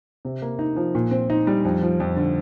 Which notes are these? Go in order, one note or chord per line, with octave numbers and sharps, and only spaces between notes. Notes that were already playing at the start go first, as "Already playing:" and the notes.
C3
A#3
D#4
F3
A#2
C4
D#4
G3
F2
F3
F2
D3